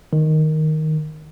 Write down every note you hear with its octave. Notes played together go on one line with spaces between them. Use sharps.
D#3